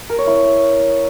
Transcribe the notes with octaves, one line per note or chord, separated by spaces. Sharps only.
A#4
C#5
E4